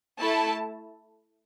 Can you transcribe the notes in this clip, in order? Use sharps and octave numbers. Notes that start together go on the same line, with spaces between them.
A3 E4 A4 A5